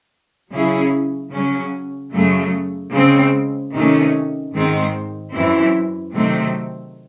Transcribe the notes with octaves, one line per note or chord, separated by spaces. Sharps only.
C#3 F#3 C#4 E4 G#4
C#3 F#3 C#4
F#2 C#3 F#3 A3
C#3 G#3 C4
C3 D#3 A3 C#4
G#2 D#3 G#3 C4
F#2 E3 C4 E4
C3 D#3 F#3 A3 C4